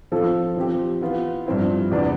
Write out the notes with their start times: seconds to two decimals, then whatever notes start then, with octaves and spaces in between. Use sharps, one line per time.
0.12 F3 C4 F4 A4
0.56 F3 C4 G4
1.01 E3 B3 F4
1.46 G2 F3 C4 E4
1.91 E2 C3 G3 B3 D4